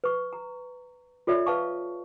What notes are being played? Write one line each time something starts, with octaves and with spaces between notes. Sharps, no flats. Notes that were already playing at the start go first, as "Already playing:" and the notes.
B4 C#6
A#5
F4 A4 C#5 D5 E5
B4 F5 A5 C#6